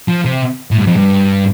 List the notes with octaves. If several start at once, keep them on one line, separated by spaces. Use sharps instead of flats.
F3
C3
A2
G2
F2
G2